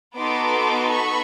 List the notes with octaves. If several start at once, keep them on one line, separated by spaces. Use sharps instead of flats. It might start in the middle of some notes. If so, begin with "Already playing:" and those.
B3 D#4 F#4 A4 C6 D6
B5 C#6